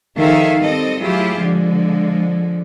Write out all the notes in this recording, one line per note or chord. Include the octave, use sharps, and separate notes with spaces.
D#3 F3 G#4 A4 E5 F5
G3 C4 A4 D#5
F#3 A3 E4 F4 G4 G#4
D3 F3 G#3